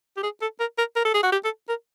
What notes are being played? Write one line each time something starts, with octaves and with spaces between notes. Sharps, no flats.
G4
G#4
A4
A#4
A#4
A#4
A4
G#4
F#4
G4
A4
A#4